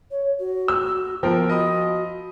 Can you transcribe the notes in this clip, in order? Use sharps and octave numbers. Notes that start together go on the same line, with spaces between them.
C#5
F#4
E6
F3 B3 F4 A#4 G5
F#4 D#5 B5 D#6